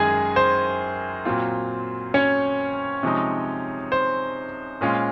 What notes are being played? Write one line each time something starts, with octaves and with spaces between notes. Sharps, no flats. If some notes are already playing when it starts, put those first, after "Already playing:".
Already playing: F#2 D#3 G#3 G#4 G#5
C5
A#2 F#3 C4 F4
C#4 C#5
C3 F3 G#3 D#4
C5
A#2 G#3 C#4 F4